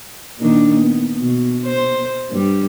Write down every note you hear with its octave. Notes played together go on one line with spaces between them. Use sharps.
A#2 D#3 D4
B3
B2
C5
G2 G3